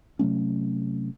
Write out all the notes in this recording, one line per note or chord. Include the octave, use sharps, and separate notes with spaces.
C3 F#3 A3 C#4